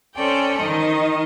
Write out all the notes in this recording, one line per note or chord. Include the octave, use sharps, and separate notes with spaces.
C#4 A4 C5 D5 G5
D#3 D#5